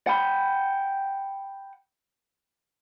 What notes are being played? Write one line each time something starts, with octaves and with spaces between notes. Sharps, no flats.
F#5 G5 B5